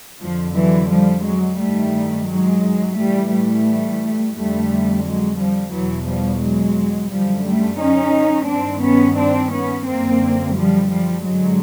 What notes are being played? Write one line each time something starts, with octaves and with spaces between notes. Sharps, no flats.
F2 D3 F3
E3 F#3
F3 G3
F#3 G#3
G2 D#3 G3 A3
F#3 G#3
A2 E3 G3 A3
G3 A3
F2 D3 G3 A3
F#3 G#3
F3 G3
E2 B2 E3 F#3
F3 G3
F#3 G#3
F#2 D3 F3 G3
G3 A3
C#4 D#4
G2 D#3 C4 D4
B3 C#4
C4 D4
B3 C#4
F#2 D3 A#3 C4
F3 G3
F3 G3
G2 D3 F#3 G#3